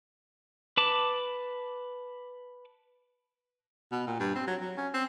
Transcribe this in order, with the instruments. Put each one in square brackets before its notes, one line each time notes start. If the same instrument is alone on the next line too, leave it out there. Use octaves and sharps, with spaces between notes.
[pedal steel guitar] B4 A5 D6
[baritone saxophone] B2
A#2
G2
C4
F#3
F#3
C#4
C4